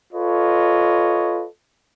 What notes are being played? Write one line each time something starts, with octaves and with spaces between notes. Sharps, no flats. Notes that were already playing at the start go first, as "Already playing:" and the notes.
F4 A4 B4 C#5 D#5